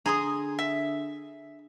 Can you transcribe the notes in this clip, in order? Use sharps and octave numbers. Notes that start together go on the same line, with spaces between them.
D3 G#4 A#5 C6 D#6
E5